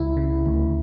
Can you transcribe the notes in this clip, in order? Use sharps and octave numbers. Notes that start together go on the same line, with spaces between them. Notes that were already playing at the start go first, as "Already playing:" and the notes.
Already playing: C#2 E4
C#3
D2